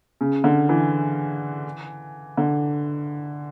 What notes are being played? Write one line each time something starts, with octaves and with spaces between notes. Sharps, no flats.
C#3
D3
E3
D3